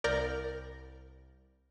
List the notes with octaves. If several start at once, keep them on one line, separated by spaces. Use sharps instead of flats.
C2 A#4 D5 A#5 G6 A#6